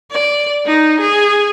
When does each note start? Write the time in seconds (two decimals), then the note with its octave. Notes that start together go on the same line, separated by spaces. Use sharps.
0.12 D5
0.66 D#4
1.01 G#4